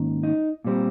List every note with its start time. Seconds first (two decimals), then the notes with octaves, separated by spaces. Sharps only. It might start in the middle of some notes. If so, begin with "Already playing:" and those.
Already playing: G#2 D#3 A#3 C#4
0.23 D#4
0.65 A#2 G3 C4